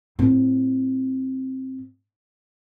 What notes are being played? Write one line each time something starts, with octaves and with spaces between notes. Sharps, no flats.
A2 C4